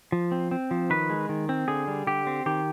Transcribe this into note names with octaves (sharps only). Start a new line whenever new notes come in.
F3
C4
C4
F3
D#3 B4
G#3
D#3
C4
D3 G#4
G3
D3 G4
C4
D#3 G4